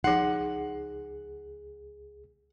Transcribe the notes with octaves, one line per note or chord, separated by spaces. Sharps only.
C#2 F3 D#4 G#4 F#5